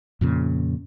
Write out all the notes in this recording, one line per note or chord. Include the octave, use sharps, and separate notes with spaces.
F2 A#2 C#3